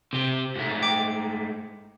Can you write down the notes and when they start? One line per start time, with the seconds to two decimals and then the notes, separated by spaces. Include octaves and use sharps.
0.13 C3 G4
0.56 G#2 A3
0.83 G5 D6